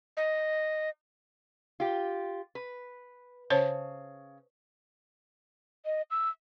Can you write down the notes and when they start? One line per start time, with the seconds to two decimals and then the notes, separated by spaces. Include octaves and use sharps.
0.17 D#5
1.80 F4 G4
2.55 B4
3.50 C#3 C5 C#5 A5
5.85 D#5
6.11 E6